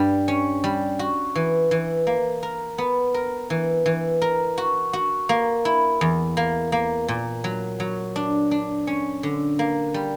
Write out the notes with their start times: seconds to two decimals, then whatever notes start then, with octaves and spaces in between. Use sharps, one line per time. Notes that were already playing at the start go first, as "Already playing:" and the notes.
Already playing: G2 G3
0.28 C#4
0.64 G3
0.99 F#4
1.35 E3
1.71 E3
2.07 A#3
2.43 A#4
2.78 B3
3.14 A#4
3.50 E3
3.86 E3
4.22 A#4
4.58 F#4
4.93 F#4
5.29 A#3
5.65 E4
6.01 E2
6.37 A#3
6.72 A#3
7.08 A#2
7.44 F#3
7.80 F#3
8.16 D4
8.51 D4
8.87 C#4
9.23 D3
9.59 A#3
9.94 G3